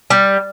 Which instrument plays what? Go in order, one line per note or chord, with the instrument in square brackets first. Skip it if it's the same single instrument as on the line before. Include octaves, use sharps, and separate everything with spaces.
[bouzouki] G3